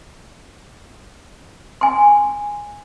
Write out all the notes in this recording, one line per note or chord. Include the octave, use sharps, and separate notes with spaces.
G#5 C6